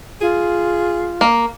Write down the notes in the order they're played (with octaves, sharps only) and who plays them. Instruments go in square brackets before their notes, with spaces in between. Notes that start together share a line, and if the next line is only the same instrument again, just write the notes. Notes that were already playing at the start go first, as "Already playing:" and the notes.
[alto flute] F4 [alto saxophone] G#4
[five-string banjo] A#3